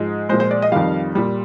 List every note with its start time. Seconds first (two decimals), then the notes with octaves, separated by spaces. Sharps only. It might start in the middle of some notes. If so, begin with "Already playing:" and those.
Already playing: G#2 F3 G#3
0.29 A#2 F3 G#3 C5
0.40 C5
0.51 D5
0.62 D#5
0.72 F2 D#3 G3 F5
1.15 A#2 G3